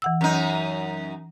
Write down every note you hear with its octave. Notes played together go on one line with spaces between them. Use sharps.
E3 F#5 E6
F#2 D#4